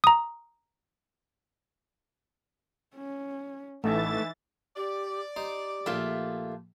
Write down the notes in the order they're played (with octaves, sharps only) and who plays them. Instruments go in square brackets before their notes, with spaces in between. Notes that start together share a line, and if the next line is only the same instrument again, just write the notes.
[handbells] A#5 D#6
[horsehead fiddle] C#4
[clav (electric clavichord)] A1 [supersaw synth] E3 A6 [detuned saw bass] A3 [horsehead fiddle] D#4 E5
[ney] G4 [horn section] D5
[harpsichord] D#4 C5 [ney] G4
[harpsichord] A#1 E5 [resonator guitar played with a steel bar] A3 A#3 F4